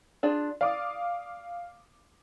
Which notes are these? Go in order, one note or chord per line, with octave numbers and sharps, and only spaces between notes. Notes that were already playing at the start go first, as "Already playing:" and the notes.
D4 F4 G#4
D5 F5 D6 D#6